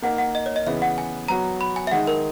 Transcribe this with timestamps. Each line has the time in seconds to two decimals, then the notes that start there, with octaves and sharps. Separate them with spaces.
0.02 A#3 D#4 A#4 F#5
0.18 F#5
0.35 D#5
0.46 C#5
0.56 D#5
0.66 C#3 E3 B3 E5
0.82 F#5
0.98 G#5
1.28 F#3 B3 F#4 A#5
1.61 B5
1.76 G#5
1.87 E5
1.91 D#3 G#3 D#4 G#4 F#5
2.07 A#4